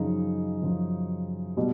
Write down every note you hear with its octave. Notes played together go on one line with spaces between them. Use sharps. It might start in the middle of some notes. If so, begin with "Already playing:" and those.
Already playing: F#2 C#3 F3 D#4
F#2 C#3 F3
B2 G3